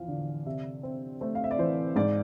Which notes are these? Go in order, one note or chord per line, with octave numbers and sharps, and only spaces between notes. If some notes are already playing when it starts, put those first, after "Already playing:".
Already playing: E2 F3 F5
D3
C3 E5
C4
A3 C5
F5
E5
D5
E3 C5
G#2 D5